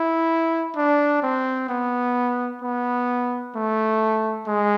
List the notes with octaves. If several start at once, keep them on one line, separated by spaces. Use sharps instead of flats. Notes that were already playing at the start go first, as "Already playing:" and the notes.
Already playing: E4
D4
C4
B3
B3
A3
G#3